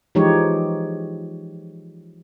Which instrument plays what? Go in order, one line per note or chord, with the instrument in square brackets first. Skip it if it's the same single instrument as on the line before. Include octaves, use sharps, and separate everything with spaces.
[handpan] E3 F3 G#3 D#4 G4 C#5